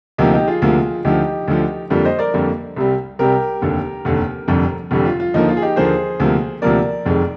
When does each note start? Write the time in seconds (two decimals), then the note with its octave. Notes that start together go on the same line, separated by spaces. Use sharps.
0.18 D2 C3 F3 A#3 D#4 G4
0.33 D#4 G4
0.47 F4 G#4
0.62 D2 C3 F3 A#3
1.05 D2 D3 F3 D#4 G4
1.48 D2 D3 F3
1.90 F2 D3 G3 A#3 F4
2.05 C5 D#5
2.19 A#4 D5
2.34 F2 D3 G3 A#3
2.76 C2 C3 G3
3.19 C2 C3 G3 G4 A#4
3.62 F1 D#2 D3
4.05 F1 D#2 D3
4.48 F1 F2 D3 G3
4.91 F1 F2 D3 G3
5.05 F4
5.20 F4
5.34 D#2 D3 F3 A#3 D#4
5.49 F4
5.57 G#4
5.62 D#4 G4
5.76 D#2 D3 F3 A#3 G#4 C5
6.20 D2 C3 F3 A#3
6.62 D2 C3 F3 A#3 A#4 D5
7.05 F1 F2 D#3 G#3